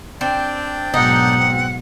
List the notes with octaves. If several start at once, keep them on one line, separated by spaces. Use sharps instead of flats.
C4 D4 D5 G5
G#2 B2 F#3 D#4 F#5
C4